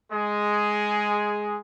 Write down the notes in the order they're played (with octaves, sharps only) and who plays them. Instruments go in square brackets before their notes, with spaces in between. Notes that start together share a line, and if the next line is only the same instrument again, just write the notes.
[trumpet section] G#3 G#4